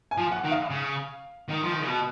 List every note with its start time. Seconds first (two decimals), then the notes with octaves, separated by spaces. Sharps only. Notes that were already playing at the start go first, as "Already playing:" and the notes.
0.11 G#5
0.18 F3
0.31 F#5
0.44 D#3
0.51 F5
0.70 C#3
1.49 D#3
1.63 F3
1.72 D#3
1.80 C#3
1.88 B2